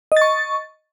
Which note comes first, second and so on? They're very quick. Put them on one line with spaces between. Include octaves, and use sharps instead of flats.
D#5 A6 C#6